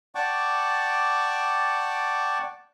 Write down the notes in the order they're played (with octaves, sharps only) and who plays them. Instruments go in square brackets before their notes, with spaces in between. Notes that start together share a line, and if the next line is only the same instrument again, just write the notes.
[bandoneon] D5 F#5 G5 A5 C#6 D6